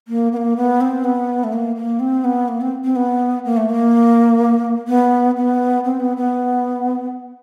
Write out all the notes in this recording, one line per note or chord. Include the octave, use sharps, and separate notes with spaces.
A#3
B3
A#3
B3
C4
B3
A3
A#3
A#3
C4
B3
A#3
C4
C4
B3
A#3
A3
A#3
B3
B3
C4
B3
B3